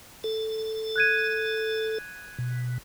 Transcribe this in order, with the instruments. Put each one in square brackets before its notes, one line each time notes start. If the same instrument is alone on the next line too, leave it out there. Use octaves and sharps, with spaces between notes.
[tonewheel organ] A4
[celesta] F#6 G#6 D#7
[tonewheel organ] B2